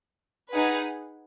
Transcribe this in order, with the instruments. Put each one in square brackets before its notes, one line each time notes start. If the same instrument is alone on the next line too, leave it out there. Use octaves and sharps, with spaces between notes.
[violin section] D#4 G#4 B4 F#5